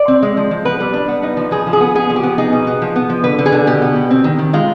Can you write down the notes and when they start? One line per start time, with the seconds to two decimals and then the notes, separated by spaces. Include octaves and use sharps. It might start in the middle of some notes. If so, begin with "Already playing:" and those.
Already playing: D5
0.08 C4
0.23 G#3
0.37 F3
0.51 F3
0.65 B3 B4
0.80 G3
0.94 D4
1.08 B3
1.23 D#4
1.37 F3
1.51 F3 G#4
1.66 F3
1.73 G#4
1.80 B3
1.95 B3 G#4
2.10 F3
2.16 G4
2.23 B3
2.38 D#4 G#4
2.52 B2
2.67 B3
2.82 F3
2.96 B3
3.10 F3
3.24 D3 B4
3.38 D3
3.46 G#4
3.52 D3
3.67 B2 G4
3.82 B3
3.95 B2
4.11 C4
4.24 D#3
4.39 D#3
4.53 G#3 F4